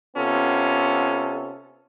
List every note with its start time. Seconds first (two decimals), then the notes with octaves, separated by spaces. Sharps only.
0.17 C3 B3 C#4 F4 A4